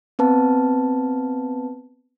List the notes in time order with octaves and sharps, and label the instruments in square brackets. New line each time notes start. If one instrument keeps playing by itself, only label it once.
[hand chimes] B3 C4 B4 A5